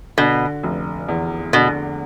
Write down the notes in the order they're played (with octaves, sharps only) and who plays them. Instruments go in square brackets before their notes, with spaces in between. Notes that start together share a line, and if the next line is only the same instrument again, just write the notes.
[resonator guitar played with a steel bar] B2 [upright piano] D3
[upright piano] F1
E2
[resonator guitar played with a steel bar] B2 [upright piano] D3